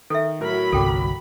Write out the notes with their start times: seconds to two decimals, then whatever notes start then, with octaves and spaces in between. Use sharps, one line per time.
0.10 D#3 A4 E5
0.41 A2 F#3 A#4 B5 F6
0.72 G1 C2 A4 G5 D6